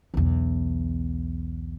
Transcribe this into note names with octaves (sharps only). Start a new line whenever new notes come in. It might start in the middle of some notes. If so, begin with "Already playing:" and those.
B1 E2